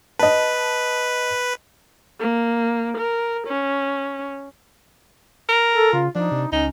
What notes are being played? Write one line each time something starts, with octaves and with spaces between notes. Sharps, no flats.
B4 D#5 A5
A#3
A#4
C#4
A#4
A4
C#3 F4
F3 D4 D#4
C3
C#2 C#4 D#4